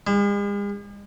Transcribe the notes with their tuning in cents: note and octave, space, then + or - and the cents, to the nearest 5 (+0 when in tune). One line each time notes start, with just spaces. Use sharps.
G#3 -45